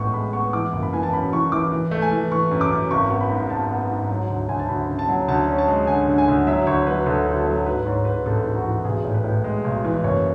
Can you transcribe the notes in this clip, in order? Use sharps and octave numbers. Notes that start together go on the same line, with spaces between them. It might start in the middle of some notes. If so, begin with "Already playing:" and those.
Already playing: A1 A2 G#3 B3 C#6
G#3 B5
B3 C#6
E3 D6
F#1
B5
E3 G#5
A5
F#2 B5
E3 C#6
E3 D6
E3
A3
G#5
E3
E3 C#6
F#2
D6
F#2
G#1 C#6
B3
B5
G#2
G#1 A5
B3
G#2
F#3
D2
D2 G#5
A5
D2 B5
C#3
A5
F#3
D2 A5
C#4
A5
G#3
D3 G#5
D3
G#5
D2
F#3 E5
D2 C#5
F#3 B4
D2 A4
D2
A4
F#3
G#2 B4
G#2 C#5
G#2 B4
A1 A4
G#2
F#4
E3
B1 G#4
A2
B4
A2
G#3
B1
E3
F#1 C#5